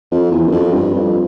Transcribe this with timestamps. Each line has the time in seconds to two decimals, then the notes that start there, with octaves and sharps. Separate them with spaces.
0.11 F2
0.31 E2
0.47 F#2
0.52 F2
0.74 G2
0.94 F2